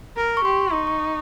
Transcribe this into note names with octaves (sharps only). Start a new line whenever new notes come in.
A#4
C#6
G4 C6
D#4 C#6
C#6